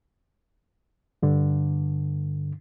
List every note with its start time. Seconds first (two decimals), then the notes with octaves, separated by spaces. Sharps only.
1.22 G2 D3